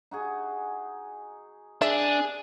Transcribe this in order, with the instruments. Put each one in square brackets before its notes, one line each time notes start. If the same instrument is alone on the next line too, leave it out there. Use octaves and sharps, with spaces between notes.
[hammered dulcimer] D#4 F#4 G#4
[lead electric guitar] D4 [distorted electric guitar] G#4 [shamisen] E5